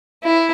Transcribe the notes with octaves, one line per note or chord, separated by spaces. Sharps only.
E4